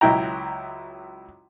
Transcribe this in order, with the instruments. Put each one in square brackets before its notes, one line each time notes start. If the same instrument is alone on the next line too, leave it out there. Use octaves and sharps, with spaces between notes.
[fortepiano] C#2 F#3 E4 G5 A#5